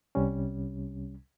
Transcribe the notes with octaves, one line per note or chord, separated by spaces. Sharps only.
C2 C3 G3 C#4